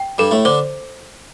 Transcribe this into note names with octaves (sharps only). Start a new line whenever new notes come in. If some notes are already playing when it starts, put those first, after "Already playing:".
Already playing: G5
G2 G3 A4
A2 A3
D3 D4 C5